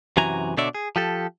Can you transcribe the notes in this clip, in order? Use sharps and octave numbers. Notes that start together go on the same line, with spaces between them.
F#2 C3 E3 F#4 G#5 A#5
B2 D3 D4 C#5 D5 E5
G#4
F3 G4 A4